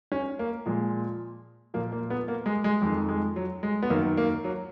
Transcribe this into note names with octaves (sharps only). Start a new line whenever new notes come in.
C#4
A#3
A#2 F3 G#3
A#2 F3 A#3
A#3
B3
A#3
G#3
G#3
F2 D#3 G#3
G#3
F#3
G#3
B3
F#2 D#3 A#3
A#3
F#3